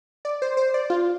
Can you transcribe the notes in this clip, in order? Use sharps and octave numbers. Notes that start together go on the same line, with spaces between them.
D5
C5
C5
D5
F4